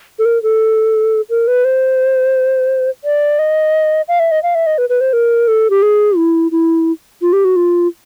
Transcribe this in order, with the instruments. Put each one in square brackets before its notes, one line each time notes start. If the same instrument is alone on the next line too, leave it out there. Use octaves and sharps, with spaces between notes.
[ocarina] A4
A#4
A4
A#4
B4
C5
D5
D#5
F5
E5
D#5
F5
E5
D#5
B4
B4
C5
A#4
A4
G4
G#4
E4
E4
F4
G4
F#4
F4